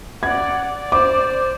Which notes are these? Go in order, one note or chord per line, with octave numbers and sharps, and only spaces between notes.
D5 F#5 G#6
D5
C5 D6